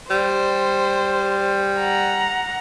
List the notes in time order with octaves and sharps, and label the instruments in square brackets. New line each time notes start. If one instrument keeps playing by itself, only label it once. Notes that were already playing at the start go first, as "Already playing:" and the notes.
[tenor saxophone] G3 [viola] C5
[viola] F#5 A#5